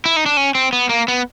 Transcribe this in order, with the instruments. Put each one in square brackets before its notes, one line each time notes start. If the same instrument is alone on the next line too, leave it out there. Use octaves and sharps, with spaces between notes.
[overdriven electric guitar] E4
D#4
D4
C#4
C4
B3
A#3
B3